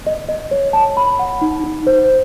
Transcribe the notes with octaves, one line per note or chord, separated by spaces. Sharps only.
D#5
D#5
C#5
A5
B5
F#5
D#4
D#4
C5